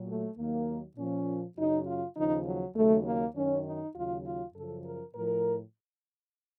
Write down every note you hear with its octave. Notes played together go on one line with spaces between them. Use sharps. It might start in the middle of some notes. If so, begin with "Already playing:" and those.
Already playing: A#2 F#3
A3
D#2 D#3 F#3 A#3
A#2 F3 C#4
F#2 C#3 F#3 D#4
F4
D#2 C#3 F3 D#4
F#3
D#2 C#3 F#3 A3
A#3
F#2 D#3 F#3 C#4
D#4
D#2 C#3 F#3 F4
F4
F#2 C#3 F3 A4
A#4
A2 F3 A#4